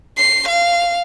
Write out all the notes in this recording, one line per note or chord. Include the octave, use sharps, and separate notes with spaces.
C7
F5